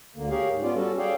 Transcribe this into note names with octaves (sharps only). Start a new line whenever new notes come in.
D2 D3 A#3
G4 G#4 A#4 C#5 F5
G#2
B3 C#4 F4 D5
G3 C#4 F#4 A4
G#4 A4 C#5 D5 F5 G5